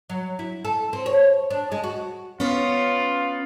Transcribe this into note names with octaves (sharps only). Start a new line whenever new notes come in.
F#3
E4
A4
C4
C#5
D4
G#3
F#4
B3 C#4 F4